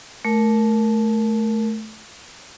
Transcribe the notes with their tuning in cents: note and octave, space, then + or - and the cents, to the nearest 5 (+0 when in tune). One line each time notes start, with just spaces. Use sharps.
A3 -15 A#4 +0